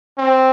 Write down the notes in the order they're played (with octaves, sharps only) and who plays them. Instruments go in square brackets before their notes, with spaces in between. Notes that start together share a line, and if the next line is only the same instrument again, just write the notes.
[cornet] C4